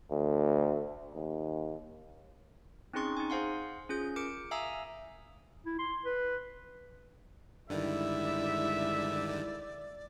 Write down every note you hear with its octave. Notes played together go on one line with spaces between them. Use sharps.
D2
D#2
C4 C#4 D#4 G#4 C6 C#6
D#4 G#5
G#4 C5 F5 F#5 C6
C#4 F4 G#4 G6
A#4 D6 C#7 D7
E5 F5 G#5 A#5 D#6 E6
E4
C6
B4
G2 D3 D#3 G#3 E4 D5 E5